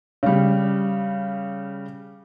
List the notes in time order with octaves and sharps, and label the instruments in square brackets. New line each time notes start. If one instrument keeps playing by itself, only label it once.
[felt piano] C#3 G3